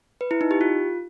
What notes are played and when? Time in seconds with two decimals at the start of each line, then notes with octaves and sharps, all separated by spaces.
0.21 B4
0.31 E4
0.41 D#4
0.51 G4
0.61 F4